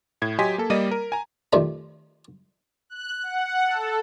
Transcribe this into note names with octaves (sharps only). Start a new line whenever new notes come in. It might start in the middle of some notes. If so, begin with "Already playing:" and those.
A2 G#6
F#3 G4 D#5 G#5 C6 B6
A#3 A4
G3 A#3 D5 D#5 D#7
A#4
G#5 A#5
C3 D#3 F3 G3 A3
F#6
F#5
A4